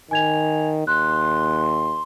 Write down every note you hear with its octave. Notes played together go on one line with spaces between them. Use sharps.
D#3 G#5 G#6 F7
D#2 C6 F#6